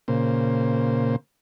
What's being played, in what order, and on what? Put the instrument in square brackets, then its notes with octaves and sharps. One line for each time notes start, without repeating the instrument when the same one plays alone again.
[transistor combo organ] A#2 C#3 A#3 C5